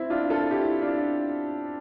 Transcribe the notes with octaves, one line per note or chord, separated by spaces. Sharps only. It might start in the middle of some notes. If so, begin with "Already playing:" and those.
Already playing: C4 E4
D4 F4
F4 A4
E4 G4
D4 F4